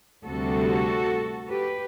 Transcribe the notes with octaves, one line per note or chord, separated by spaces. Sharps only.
D2 C3 G3 F#4 A4
G4 B4